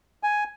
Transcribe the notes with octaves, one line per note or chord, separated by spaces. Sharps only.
G#5